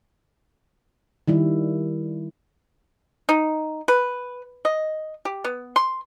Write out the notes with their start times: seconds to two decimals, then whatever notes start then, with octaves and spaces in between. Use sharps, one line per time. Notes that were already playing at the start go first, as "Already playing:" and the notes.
1.28 D#3 G3 E4
3.29 D#4
3.88 B4
4.65 D#5
5.25 G4
5.44 B3
5.76 C6